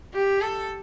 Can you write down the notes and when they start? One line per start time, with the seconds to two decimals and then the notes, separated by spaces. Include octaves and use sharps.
0.14 G4
0.41 A4